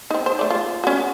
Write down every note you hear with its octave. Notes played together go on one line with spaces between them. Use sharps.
C4 D#4
C5
A3 D5
F4
C#4 F#4